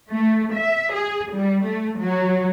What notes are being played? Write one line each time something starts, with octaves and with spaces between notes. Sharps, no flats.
A3
E5
G#4
G3
A3
F#3